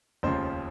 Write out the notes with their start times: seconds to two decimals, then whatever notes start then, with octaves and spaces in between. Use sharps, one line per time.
0.23 F1 D#2 C#3 F3 C5